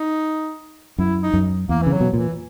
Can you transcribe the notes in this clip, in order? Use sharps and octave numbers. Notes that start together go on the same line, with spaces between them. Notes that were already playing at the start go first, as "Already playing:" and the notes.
Already playing: D#4
F#2 E4
D#4
F#2
E2 A#3
C#3 E3
F#3
B2
A#2 E3